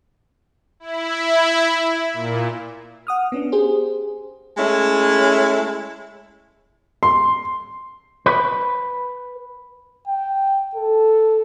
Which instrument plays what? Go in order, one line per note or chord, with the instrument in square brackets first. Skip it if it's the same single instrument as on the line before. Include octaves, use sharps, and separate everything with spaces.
[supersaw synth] E4
A#2
[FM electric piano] F#5 D#6 F6
B3 C#4 D4
G4 G#4 C5
[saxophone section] G#3 A3 C#4 E4
[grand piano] C6
[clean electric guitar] B4
[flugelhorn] G5
A4